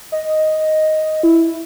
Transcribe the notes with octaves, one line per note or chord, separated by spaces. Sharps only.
D#5
E4